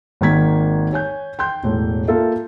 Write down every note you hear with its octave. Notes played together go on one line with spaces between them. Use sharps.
G#1 D#3 A#3 G#6 B6
C#5 G#5 G6
G5 C6 G6
E1 A2
A#3 F4 A4 E5 F5